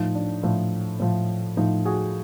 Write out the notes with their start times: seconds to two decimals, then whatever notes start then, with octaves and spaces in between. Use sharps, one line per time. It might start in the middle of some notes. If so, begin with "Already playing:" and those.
Already playing: A2 F3 D#4
0.15 D4
0.43 A2 F3
1.00 A2 F3
1.57 A2 F3 D#4
1.85 F#4 G#4